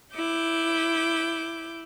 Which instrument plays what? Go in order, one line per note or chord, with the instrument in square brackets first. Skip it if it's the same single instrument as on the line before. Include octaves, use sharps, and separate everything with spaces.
[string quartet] E4 D6 G6